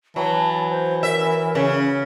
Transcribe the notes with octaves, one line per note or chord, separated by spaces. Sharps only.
E3 F#3 A5
C5
A#4 E5
C#3